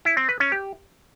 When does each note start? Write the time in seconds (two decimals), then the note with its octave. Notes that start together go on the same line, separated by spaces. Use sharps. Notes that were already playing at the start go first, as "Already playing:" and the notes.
0.05 E4
0.17 C4
0.29 B4
0.40 C#4
0.52 G4